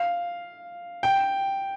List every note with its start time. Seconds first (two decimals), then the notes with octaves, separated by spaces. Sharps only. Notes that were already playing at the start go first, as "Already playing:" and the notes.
Already playing: F5
1.03 G5